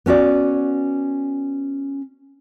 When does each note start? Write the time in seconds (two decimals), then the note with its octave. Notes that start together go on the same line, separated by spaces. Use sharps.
0.06 B3 C#4 F#4 D5